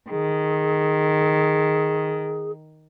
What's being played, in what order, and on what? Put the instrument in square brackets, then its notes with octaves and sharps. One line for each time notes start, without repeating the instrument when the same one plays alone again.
[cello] D#3 [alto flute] G#4